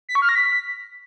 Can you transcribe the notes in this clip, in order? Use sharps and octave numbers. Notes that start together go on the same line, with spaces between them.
B6
C#6
F6
A#6
B6